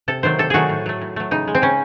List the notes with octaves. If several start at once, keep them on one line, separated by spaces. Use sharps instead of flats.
C3 A4
D#3 F#3 A3 C5
C3 A4
D#3 F#3 A3 F#4 G#4
A2
F#3 A3
A2
F#3 A3
C#3 D#4
G#3
C4
C#3 C#4